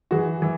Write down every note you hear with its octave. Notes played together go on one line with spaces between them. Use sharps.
E3 F#4 G#4
E3